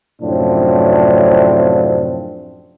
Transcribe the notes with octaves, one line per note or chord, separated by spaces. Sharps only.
F#2 A2 C3 F3 C4 D4